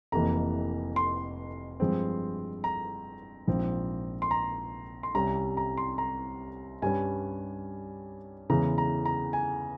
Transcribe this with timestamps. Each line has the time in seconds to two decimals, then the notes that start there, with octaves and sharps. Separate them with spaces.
0.12 F1 F2 C3 E3 A#3 A#5
0.96 C6
1.80 G2 F3 G#3 C4
2.64 A#5
3.47 A#1 G#2 F3 C4
4.22 C6
4.31 A#5
5.03 C6
5.15 C2 C3 G3 C#4 A#5
5.57 A#5
5.78 C6
5.98 A#5
6.82 G2 G3 C#4 G#5
8.50 E2 C#3 E3 G#3 A#5
8.78 A#5
9.06 A#5
9.33 G#5